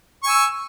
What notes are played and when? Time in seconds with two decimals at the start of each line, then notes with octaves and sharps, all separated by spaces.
0.23 C#6
0.26 G#5
0.29 E6